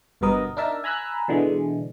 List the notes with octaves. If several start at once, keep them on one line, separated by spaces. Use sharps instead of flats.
G1 G2 B2 B3 A#4 D#5
D4 D#4 A#4 E5 A5
G#5 A#5 B5 E6 F#6
B2 D3 E3 G#3